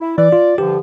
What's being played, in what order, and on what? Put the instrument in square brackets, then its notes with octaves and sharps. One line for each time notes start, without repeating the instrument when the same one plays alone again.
[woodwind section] E4
[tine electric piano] E3 [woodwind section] D5
[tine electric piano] F4
[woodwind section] G2 D3 F3 [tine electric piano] G4